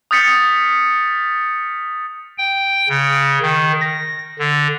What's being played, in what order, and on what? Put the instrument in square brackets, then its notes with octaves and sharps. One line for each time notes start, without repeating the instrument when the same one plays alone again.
[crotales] D#6 F6 G6 A6 B6 C#7
[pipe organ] G5
C#3
D#3
A#6
D3